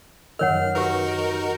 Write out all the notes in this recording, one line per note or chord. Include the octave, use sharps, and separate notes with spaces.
F#2 D#3 A#4 C#5 D#5 F#5 F6
D#4 F#4 G4 A#4 B4